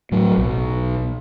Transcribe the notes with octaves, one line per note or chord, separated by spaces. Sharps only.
A2 F#3
B1